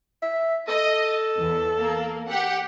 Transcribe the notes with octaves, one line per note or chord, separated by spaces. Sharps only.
E5
A4 D#5
E2
A#3
G4 F#5